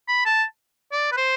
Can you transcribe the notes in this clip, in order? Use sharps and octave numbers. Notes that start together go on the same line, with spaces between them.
B5
A5
D5
B4
C5